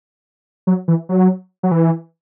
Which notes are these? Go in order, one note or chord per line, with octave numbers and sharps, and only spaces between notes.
F#3
E3
F#3
F#3
E3